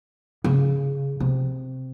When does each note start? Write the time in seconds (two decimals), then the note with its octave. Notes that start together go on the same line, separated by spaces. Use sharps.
0.44 C#3
1.20 C3